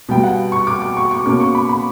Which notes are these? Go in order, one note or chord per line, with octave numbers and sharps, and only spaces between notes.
B2 G3 B3 G5
F#5
C#6
D6
D6
C#6
C#6
B2 A#3 C#4 D6
C#6
B5
B5